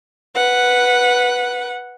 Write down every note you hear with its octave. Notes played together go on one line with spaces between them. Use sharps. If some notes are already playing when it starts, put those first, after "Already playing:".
B4 F#5